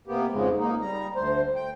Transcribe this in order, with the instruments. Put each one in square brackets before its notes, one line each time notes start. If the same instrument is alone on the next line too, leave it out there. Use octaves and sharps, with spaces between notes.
[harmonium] C3 A#3 B3 G4
F2 G#2 C#3 G#3
A#3 D#4
G3 A#5
D2 C5
G5